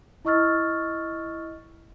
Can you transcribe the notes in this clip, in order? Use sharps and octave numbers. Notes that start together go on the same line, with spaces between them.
E4 D#5 C#6 E6 F6 A6